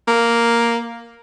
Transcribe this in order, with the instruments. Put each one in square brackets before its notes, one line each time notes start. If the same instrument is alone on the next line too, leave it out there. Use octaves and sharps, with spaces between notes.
[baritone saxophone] A#3